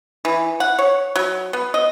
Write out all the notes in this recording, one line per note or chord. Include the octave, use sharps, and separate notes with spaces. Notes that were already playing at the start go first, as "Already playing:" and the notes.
E3
F#5
C#5
F#3
B3
D#5